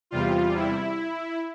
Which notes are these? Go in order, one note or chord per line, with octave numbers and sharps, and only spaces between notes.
E2 C3 G3 F4
E4